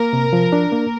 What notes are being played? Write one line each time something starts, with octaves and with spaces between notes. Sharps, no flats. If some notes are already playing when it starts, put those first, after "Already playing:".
Already playing: A#3 A#4
C3
F3
D4
A#3